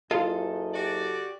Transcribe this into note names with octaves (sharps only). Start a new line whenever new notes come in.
F#1 F4 A4 D#5
F#4 G4 D5